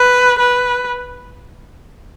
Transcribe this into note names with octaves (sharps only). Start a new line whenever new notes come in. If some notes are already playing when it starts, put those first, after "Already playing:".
Already playing: B4
B4